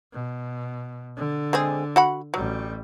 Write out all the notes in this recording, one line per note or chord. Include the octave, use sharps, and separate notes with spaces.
B2
D3
G#3 C4 G#4
F#4 F#5 B5
A1 F#3 G3